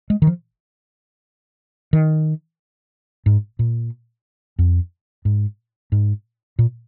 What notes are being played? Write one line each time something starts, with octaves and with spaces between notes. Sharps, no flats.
G#3
D#3
F3
D#3
G#2
A#2
F2
G#2
G#2
A#2